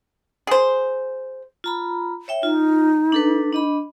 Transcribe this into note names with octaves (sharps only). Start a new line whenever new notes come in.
G#4 C5
F4 A#5 B5
C#5 E5 G5
D#4 F4
D4 A4 B4
D4 D#5 B5